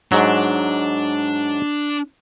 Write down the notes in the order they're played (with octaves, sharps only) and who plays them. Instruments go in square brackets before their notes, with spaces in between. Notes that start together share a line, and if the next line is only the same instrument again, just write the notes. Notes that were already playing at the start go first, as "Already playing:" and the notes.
[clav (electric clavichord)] G#2 F#3 [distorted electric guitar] D4